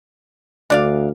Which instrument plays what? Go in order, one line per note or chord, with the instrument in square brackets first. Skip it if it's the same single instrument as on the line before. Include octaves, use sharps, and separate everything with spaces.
[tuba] D2 [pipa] D4 D5 F5